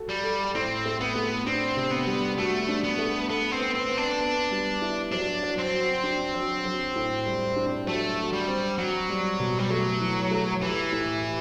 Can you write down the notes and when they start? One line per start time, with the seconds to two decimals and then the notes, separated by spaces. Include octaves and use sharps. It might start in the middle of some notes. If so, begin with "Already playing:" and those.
Already playing: F#4 A4
0.09 G3
0.24 A4
0.55 A2 C4
0.85 A3
1.00 B3
1.15 A3
1.47 C4 D4
1.77 C3
1.91 B3
2.07 G3
2.38 A3 F#4
2.69 D4
2.84 B3
2.99 A3
3.29 B3 A4
3.52 C4
3.60 B3
3.75 C4
3.90 B3
3.97 D4
4.21 B3
4.51 G3
4.82 E4
5.12 F#3 D4
5.43 F#3
5.59 C4
5.73 F#4
6.04 D4
6.34 F#3
6.66 F#3
6.96 A2
7.26 G3
7.56 D4
7.87 F#3 A3
8.17 F#4
8.33 G3
8.48 C4
8.78 F#3 F#4
9.10 G3
9.40 B2
9.58 G3
9.70 F#3 A3
10.01 E3
10.31 A3
10.62 E3 G4
10.92 A2
11.22 G4